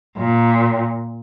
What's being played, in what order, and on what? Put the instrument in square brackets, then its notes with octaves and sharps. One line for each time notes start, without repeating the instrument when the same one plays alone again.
[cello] A#2